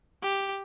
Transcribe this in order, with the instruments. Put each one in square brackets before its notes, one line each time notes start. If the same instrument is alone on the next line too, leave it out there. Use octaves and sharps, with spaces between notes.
[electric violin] G4